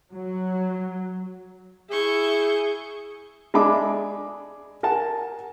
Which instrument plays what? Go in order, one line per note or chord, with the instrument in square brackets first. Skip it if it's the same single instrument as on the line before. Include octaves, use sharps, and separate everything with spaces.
[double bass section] F#3
[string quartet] E4 C#6 G6 [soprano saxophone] G#4
[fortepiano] G#3 D4 E5 A5 B5 D6
A#4 F#5 G#5 A5